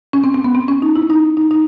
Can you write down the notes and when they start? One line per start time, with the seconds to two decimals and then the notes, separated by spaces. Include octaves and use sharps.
0.13 C#4
0.24 C4
0.34 C4
0.44 B3
0.55 C4
0.68 C#4
0.82 D#4
0.96 E4
1.10 D#4
1.37 D#4
1.51 D#4